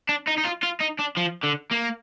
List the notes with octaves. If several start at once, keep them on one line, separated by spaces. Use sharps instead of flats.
D4
D#4
D#4
F4
F4
D#4
D4
F3
D3
A#3